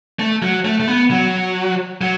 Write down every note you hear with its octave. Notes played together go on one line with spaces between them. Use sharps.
A3
F#3
A3
A3
B3
F#3
F#3